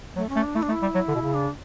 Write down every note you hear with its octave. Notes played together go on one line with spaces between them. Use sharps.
F#3 A3
C#4
A3
D4
A3 E4
D4
A3 E4
G3
F#3
D3
B2
C#3
D4